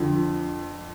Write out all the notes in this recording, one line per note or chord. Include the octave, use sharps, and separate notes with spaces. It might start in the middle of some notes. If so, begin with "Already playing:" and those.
Already playing: F2 D3 F3